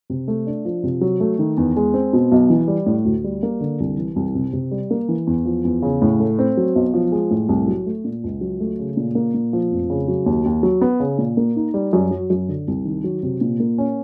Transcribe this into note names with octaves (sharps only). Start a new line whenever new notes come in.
C3
A3
D4
F3
C3
F#3
A3
D#3
E2
G#3
C4
B2
B1
E3
G3
A2
D2
G3
A#3
D3
C2
E3
C2
C3
C3
G3
A#3
E3
E2
F3
E2
C#3
A2
A3
C4
F#3
B1
F3
G#3
A2
C2
F#3
A3
A#2
C#2
F#3
A3
C#3
A#2
A#3
A#2
F3
F1
C#3
F#3
D#2
D#2
F#3
B3
C#3
A#2
A#3
D#4
G3
F#2
F#3
F#2
D3
C2
D#3
F#3
C3
A#2
A#3
C#4